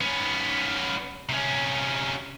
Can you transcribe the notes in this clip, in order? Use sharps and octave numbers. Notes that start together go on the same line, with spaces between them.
B3 C#4
C3 C#4